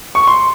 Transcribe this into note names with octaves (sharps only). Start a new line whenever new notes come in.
C#6
C6